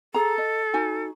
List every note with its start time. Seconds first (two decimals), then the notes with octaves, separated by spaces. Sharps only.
0.14 G#4 A4 A#5
0.38 D#5
0.74 D#4 F#4 G#5